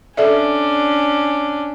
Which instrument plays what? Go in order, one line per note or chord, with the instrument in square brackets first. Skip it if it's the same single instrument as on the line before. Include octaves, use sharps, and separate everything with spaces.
[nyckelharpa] C#4 D4 [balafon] A4 D5 E5